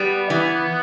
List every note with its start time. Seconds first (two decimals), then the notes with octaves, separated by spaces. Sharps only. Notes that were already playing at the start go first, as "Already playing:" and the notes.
Already playing: G3 B3
0.30 E3